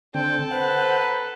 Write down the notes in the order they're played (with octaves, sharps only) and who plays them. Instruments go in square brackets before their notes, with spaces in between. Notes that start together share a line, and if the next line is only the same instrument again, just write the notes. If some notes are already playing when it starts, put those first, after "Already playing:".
[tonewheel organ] D3 C4 [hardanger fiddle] A4 [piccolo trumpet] G5
[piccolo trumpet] B4 [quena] C5 [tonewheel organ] F#5
[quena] A#5